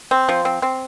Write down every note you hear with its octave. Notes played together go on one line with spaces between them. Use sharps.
C4
F3
C4
C4